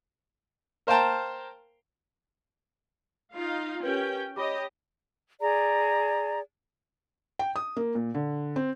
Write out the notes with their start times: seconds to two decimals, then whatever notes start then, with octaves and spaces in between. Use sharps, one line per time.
0.87 A#4 C5 F5 G5 A5 A#5
3.33 D#4 F4 F5
3.83 C#4 G4 A#4 B4 G5
4.36 G4 C#5 D#5 B5 D6
5.40 G#4 D5 A#5
7.39 G5
7.56 D#6
7.77 A#3
7.95 A#2
8.15 D3
8.56 C4